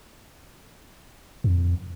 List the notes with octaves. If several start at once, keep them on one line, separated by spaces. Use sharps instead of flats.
F2